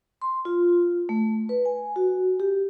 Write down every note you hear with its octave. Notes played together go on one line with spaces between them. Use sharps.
C6
F4
A3
B4
G#5
F#4
G4